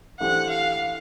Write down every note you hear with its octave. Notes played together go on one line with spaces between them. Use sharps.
E3 A3 D4 G4 C5 F#5
F5